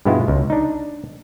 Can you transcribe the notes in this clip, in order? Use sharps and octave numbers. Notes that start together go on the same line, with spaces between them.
G2 B2 G#3 B3 E4 F4
C#2
D4 D#4